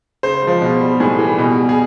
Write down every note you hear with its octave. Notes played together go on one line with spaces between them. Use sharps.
C#3 C5
F3 G#3
B2
G3
A2 G#4
E3 G3
B2
G3
G#4